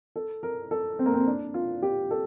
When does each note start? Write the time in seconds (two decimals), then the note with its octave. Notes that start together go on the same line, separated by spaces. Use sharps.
0.16 A4
0.43 A#4
0.71 A4
0.99 C4
1.06 A#3
1.14 C4
1.27 D4
1.54 F4
1.83 G4
2.11 A4